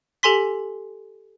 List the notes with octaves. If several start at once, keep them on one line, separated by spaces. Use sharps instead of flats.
G4 A4 G#5 C6 B6